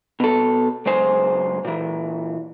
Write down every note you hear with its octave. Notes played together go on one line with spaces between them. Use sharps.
B2 A4
C#2 F#2 G#3 C5 G#5
A#2 E3